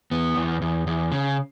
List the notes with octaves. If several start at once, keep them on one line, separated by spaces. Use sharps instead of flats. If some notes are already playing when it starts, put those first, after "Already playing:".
E2 B3
E2
E2
E2
C#3